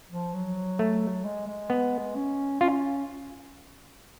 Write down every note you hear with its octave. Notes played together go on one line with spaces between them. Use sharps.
F3
F#3
A3
G#3
G#3
B3
C#4
C#4 F4